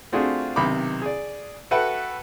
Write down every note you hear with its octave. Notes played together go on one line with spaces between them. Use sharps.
A3 C4 D4 F4 F#4 G#4
B1 C3 D#3 B5 D6
G#4 D5
F#4 A4 B4 E5 F#5 G5